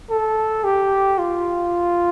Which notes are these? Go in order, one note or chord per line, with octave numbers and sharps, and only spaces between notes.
A4
G4
F4